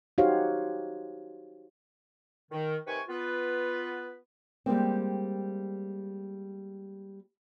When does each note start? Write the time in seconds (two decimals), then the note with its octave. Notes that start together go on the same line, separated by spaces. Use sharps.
0.18 D#4 F#4 G4 C5 C#5 F5
2.51 D#3
2.87 C3 D#3 B4 G5 G#5 C#6
3.08 B3 F4 B4
4.66 G3 G#3 A#3 C4